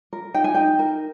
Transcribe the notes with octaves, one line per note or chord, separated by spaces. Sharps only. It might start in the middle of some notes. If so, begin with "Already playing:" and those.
A#4
D#4 G5
G#5
D#4 G5
A#4